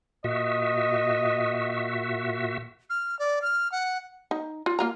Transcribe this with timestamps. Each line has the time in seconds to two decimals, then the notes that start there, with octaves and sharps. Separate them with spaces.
0.24 A#2 F#4 D#5 E5
2.90 F6
3.19 D5
3.42 F6
3.72 F#5
4.31 D#4
4.66 F4
4.79 A#3 F4 A#5